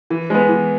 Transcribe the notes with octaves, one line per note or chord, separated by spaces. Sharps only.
E3
G#3 B3
E3